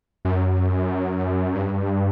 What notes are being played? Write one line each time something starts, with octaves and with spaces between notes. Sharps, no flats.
F#2
G2